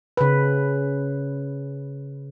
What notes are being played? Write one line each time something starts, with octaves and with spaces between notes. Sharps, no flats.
C#3 B4